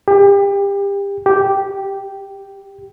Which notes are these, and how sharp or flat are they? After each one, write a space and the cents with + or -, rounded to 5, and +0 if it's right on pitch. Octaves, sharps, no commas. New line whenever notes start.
G4 +30
G4 -5